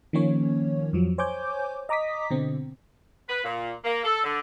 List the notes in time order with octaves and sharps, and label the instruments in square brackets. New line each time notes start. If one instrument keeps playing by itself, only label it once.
[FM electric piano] D#3 F3 A#3 C#4 C#5
F2 F3 F#3
C5 C#5 G#5 D6 G6
D#5 A#5 D6 D#6 B6
B2 D3 C4
[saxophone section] B4
A#2
A#3
A4
D3